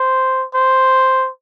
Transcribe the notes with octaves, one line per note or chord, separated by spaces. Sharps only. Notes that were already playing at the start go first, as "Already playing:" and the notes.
Already playing: C5
C5